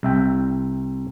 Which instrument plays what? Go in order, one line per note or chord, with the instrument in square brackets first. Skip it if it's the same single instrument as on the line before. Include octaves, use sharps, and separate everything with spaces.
[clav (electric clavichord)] C2 E5 G5